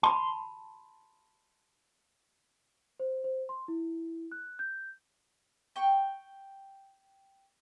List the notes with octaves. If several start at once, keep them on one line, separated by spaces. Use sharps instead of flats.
A5 B5 C6
C5
C5
C6
E4
F#6
G6
G5 C#6